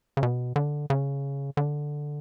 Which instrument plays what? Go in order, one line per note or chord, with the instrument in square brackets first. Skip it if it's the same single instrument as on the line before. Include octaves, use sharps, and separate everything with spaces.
[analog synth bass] C#3
B2
D3
C#3
D3